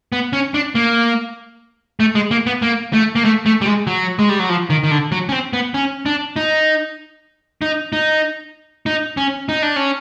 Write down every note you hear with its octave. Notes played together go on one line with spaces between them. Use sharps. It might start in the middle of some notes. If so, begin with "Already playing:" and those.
B3
C#4
D4
A#3
A3
G#3
A#3
B3
A#3
A3
A#3
A3
A3
G3
G#3
F#3
G#3
G3
F#3
F3
D#3
D#3
D3
F#3
C#4
C4
B3
C#4
D4
D#4
D#4
D#4
D#4
C#4
D#4
D4
C#4